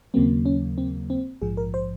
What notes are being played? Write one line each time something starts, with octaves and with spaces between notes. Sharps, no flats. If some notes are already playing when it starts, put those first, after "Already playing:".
D#2 C#3 F#3 A#3 C4
C#4
C4
C4
A#1 G#2 F3 G#4
A#4
C5